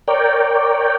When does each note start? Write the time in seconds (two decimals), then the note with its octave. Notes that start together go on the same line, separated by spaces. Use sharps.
0.08 A#4 C#5 D5 G5